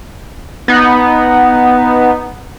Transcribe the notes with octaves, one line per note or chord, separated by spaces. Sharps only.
B3 D#4